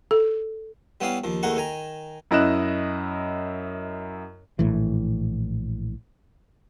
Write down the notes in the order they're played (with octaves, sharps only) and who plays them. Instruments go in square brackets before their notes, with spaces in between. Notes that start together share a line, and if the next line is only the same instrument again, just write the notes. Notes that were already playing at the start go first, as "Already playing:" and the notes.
[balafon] A4
[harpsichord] G3 B3 C#4 E4 F5 D#6
D#2 F3
D#2 A2 D#4 G#4 F#5 C#6
D#3 G#5 A#5
[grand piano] F#2 E4 D#5 F#6 E7
[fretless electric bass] A#1 A2 E3